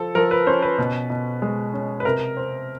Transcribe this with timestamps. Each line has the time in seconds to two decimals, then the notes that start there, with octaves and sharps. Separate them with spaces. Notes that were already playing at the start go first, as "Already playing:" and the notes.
Already playing: F3 A4
0.15 F3 A#4
0.31 B4
0.47 C#4 C5
0.62 B4
0.78 B2
1.10 B2
1.42 G#3
1.74 C#4
2.00 B4
2.05 C3 A#4
2.37 C4